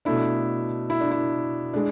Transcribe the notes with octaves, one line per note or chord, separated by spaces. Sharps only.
B2 A3 D4 E4
E4
D4
E4
G#3 D4